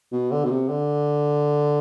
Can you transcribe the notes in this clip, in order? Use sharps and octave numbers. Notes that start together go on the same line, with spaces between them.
B2
D3
B2
C3
D3